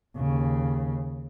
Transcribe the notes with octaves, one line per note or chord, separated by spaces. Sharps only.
D#2 C#3